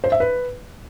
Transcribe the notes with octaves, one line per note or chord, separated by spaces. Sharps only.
C5
E5
B4